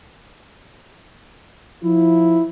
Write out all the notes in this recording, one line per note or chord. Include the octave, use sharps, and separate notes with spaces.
F3 E4